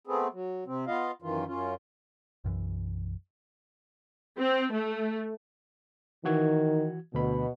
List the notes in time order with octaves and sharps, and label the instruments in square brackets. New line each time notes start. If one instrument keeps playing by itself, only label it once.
[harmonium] A3 B3 C4 G#4
F#3
C3 C4
B3 F4 D#5 F5
F#2 D#3 E3 F4
F#2 C#4 F4
[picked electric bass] B1 F#2 E3
[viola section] C4
A3
[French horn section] D#3 [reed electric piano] E3 F#4 G#6
[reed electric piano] D2 B5 [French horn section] B2